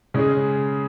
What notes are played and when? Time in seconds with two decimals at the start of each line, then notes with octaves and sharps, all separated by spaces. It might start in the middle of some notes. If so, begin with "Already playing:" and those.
0.14 C#3 G#3 C#4 G#4